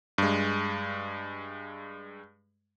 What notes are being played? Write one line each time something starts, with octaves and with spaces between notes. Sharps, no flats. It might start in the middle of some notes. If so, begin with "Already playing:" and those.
G2 G#3